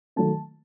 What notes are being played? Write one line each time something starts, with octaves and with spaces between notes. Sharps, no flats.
D#3 F#3 A3 A5